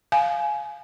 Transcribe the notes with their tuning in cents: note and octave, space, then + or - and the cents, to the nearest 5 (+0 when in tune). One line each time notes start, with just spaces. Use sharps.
F5 +0 G#5 +20